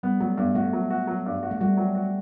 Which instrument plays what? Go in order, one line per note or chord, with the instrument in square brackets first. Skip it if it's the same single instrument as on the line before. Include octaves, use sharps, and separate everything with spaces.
[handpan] G3 [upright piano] B3
[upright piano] F#3 [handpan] A3
[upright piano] G2 [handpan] B3
[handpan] A3 [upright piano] F#4
[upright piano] F#3
F#4
F#3
G2
F#4
[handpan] A3
[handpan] G3 [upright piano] F#4
[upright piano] F#3
F#4